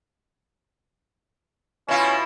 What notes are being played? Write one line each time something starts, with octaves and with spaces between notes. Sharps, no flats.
B2 C#4 E4 F4